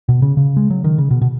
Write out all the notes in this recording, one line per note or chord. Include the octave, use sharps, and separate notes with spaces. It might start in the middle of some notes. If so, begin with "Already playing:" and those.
B2
C#3
C#3
G#3
F#3
D#3
C#3
B2
B2